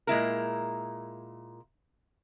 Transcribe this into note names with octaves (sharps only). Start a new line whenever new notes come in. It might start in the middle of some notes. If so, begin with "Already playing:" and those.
A#2 G#3 E4 A#4